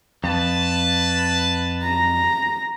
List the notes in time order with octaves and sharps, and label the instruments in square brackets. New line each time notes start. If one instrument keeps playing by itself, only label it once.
[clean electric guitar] F2 [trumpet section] B4 A5
[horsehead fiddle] A#5